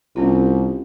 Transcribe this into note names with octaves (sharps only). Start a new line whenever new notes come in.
C2 C4 C#4 F4